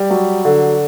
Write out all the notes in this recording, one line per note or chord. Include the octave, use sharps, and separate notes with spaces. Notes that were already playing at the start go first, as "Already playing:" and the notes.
Already playing: G3
F#3
D3